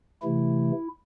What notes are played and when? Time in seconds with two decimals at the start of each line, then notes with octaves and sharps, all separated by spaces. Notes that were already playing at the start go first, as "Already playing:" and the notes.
0.23 C3 E3 A3 E4